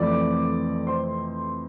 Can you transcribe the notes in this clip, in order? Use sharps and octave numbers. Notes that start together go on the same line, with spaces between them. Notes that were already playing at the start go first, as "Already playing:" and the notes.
Already playing: F2 C3 E3 A3 D5 D6
C5 C6